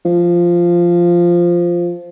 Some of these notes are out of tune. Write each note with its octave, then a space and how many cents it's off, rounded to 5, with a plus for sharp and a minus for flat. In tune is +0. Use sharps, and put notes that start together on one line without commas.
F3 -5